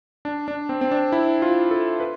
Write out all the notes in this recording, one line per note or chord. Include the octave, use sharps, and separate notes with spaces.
D4
D4
C4
C4
D4
E4
F4
A4
B4